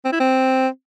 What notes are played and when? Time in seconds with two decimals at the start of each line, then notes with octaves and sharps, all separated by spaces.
0.05 C4
0.12 E4
0.20 C4